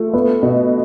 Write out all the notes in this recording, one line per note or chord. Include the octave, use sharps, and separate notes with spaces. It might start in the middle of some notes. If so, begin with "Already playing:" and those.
Already playing: A3 F4
B3
B2